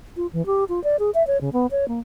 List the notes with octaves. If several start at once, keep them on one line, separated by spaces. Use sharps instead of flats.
F4
E3
G4
F4
D5
G#4
E5
C#5
C#3
B3
C#5
A#3